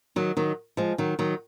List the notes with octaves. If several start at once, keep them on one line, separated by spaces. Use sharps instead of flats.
D#3 F#3
D#3 F#3
F3 G#3
D#3 F#3
D#3 F#3